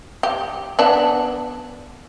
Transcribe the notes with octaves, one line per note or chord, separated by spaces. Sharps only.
G4
B3 D4